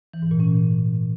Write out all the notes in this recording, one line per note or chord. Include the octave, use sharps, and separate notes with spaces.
E3
G#2
A#2
C#4